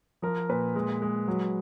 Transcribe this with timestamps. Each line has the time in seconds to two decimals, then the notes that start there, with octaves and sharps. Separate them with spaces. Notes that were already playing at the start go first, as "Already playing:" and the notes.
0.22 F3 A#4
0.49 A#2 B4
0.76 G#3
1.02 G#3
1.28 F#3